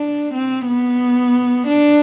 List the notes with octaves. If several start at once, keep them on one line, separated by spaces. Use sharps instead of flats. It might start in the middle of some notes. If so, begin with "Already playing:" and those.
Already playing: D4
C4
B3
D4